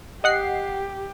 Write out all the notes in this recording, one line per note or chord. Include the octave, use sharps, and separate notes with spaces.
G4 D#5 F#5 C7